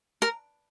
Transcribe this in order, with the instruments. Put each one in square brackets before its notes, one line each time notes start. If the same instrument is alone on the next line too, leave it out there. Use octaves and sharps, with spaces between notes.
[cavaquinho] A#4